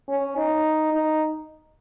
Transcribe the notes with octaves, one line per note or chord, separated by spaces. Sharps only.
C#4
D#4
D#4